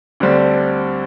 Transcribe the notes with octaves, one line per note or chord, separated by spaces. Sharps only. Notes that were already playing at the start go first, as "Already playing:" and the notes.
D2 D3 G3 C4